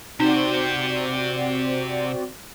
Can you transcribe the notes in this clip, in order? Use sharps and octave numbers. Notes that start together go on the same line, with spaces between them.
C3 C4 D#4 F#4 C5 D5